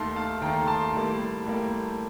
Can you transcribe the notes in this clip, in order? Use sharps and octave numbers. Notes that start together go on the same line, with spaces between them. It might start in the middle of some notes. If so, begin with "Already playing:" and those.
Already playing: D#2 D#3 A3 A5 C6
F5 A5
D#2 D#3 A3 G5 A#5
A5 C6
A2 G3 A#3
A2 G3 A#3